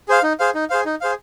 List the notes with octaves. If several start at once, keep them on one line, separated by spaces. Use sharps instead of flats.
G#4 C5 F5
D#4
G#4 C5 F5
D#4
G#4 C5 F5
D#4
G#4 C5 F5